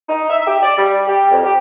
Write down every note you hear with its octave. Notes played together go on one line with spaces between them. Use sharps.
D#4
E5
G4
D5
G3
G4
F2
G4